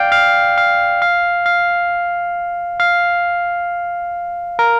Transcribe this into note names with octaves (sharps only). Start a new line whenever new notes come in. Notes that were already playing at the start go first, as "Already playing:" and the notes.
Already playing: D5 F5 G5
F5
F5
F5
F5
F5
A#4